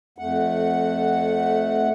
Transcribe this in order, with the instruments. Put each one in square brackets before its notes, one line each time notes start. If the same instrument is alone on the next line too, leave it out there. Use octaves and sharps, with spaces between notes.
[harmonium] F2 A3 F#5